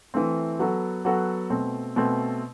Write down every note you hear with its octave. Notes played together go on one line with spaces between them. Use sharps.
E3 A3 C4
F#3 B3 F#4 A4
F#3 B3 F#4 A4
B2 A3 C4
B2 A3 C4